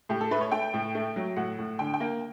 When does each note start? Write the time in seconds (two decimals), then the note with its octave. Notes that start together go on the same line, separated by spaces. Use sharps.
0.09 A2 G4
0.21 A4
0.31 A3 B4
0.41 C#5
0.52 A3 G5
0.74 A2
0.95 A3
1.16 F#3
1.36 A2 F#5
1.59 A2
1.79 D3 G5
1.94 G5
2.00 A#3